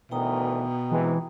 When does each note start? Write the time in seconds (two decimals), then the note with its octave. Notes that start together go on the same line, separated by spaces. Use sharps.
0.11 D2 B2 D#3 E3 G5 A#5 D#6
0.92 G#2 C3 E3 G#3